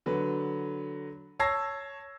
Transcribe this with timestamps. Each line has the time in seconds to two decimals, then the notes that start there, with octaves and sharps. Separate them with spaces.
0.06 D3 F#3 B4
1.39 C#5 A5 E6 G#6 A#6 C7